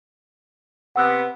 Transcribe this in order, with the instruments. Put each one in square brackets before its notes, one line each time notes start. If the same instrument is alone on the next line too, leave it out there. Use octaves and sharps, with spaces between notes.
[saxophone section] C3 B3 [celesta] F#5 E6 F#6